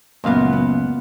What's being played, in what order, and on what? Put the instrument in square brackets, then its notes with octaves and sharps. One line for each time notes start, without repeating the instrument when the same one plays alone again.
[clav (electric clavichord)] C#2 F#2 F5 [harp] A#2 B3
[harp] B3